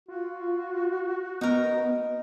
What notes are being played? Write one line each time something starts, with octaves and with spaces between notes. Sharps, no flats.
F4 F#4
B3 D#4 A#4